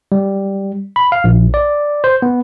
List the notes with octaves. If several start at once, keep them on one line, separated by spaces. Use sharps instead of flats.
G3
B5
F5
A#1
D5
C5
B3